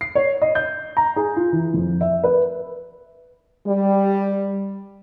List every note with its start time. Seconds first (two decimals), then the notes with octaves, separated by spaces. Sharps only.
0.01 C7
0.15 C#5
0.42 D#5
0.55 G6
0.97 A#5
1.16 G#4
1.36 F4
1.53 E3
1.74 F2
2.01 E5
2.24 B4
3.67 G3